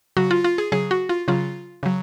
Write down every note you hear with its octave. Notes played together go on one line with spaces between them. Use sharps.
C#3 F#3 F#4
F4
F4
G#4
C#3 F#3 G#4
F#4
F4
C#3 F#3 F4
C#3 F#3